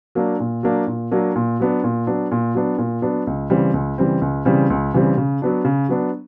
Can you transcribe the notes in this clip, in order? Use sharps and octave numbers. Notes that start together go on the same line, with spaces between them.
F#3 A#3 D4
A#2
F#3 A#3 D4
A#2
F#3 A#3 D4
A#2
F#3 B3 D4
A#2
F#3 B3 D4
A#2
F#3 B3 D4
A#2
F#3 B3 D4
C#2
C#3 E3 G3 C4
C#2
C#3 E3 G3 C4
C#2
C#3 E3 G3 C4
C#2
C#3 E3 G3 C4
C#3
F#3 B3 D4
C#3
F#3 B3 D4